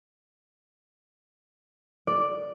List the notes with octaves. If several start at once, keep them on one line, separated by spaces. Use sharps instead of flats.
D5